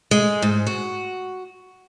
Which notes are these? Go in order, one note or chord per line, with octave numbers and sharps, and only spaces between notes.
G#3
G#2
F#4